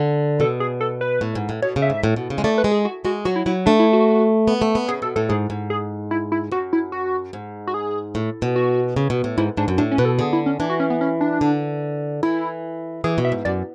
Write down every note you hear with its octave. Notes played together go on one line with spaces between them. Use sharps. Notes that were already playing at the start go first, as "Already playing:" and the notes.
Already playing: D3
B2 A4
G#4
A4
B4
A2
G#2
A2
B2 C#5
C#3
E5
G#2
A2
B2
C#3
G#3
A3 D5
B4
G#3
G#4
F#4
G#3 F#4
F#3 F#4
E4
F#3 E4
A3 D4
E4
F#4
B3
A3
B3
C#3 G#4
B2 A4
A2 A4
G#2 G#4
G#2
G#4
E4
E4
F#2 F#4
E4
F#4
G#2
F#4
G#4
A2
B2
F#4
C#3
B2
A2
G#2 E4
G#2 D4
F#2
A2 D4
C#4
B2 B4
A4
D3 G#4
E4
C#4
E3 D4
F#4
C#4
B3
C#4
D4
D3
E3 E4
E3 G#4
B2
E5
G#2
F#2 D5